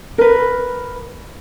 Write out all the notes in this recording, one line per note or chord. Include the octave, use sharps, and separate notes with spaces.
A#4 B4